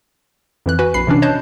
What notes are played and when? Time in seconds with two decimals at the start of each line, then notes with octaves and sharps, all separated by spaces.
0.66 F2 E3 F#6
0.79 F#4 B4 G#5
0.94 A#1 B5 C7
1.07 C3 E3 C#4 D4
1.22 C#5 D#5 A5 F#6 G6